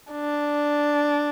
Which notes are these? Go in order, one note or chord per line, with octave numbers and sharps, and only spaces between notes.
D4